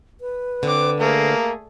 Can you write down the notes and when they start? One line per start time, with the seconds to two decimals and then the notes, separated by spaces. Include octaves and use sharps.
0.21 B4
0.63 D3 C4 D6
1.00 A3 A#3 G#4